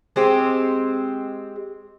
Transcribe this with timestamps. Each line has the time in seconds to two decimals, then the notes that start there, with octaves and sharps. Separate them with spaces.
0.16 G#3 C4 G4